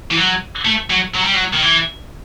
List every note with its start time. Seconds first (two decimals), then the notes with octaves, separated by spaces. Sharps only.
0.11 E3
0.16 F#3
0.65 A3
0.90 F#3
1.14 F#3
1.24 G3
1.34 F#3
1.53 D#3
1.62 E3